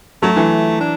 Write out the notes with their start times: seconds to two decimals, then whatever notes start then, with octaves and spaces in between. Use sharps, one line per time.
0.23 F#3 A3
0.36 E3
0.80 D4